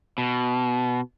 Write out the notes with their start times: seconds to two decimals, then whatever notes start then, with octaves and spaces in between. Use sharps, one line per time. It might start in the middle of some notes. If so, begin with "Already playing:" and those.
0.18 B2